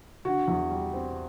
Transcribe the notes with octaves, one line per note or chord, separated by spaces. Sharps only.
D3 F#4
E2
G3
C4